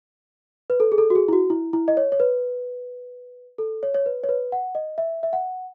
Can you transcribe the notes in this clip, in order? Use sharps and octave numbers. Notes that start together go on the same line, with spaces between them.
B4
A4
G#4
A4
F#4
G#4
E4
F#4
E4
E4
D#5
C#5
C#5
B4
A4
C#5
C#5
B4
C#5
B4
F#5
D#5
E5
E5
F#5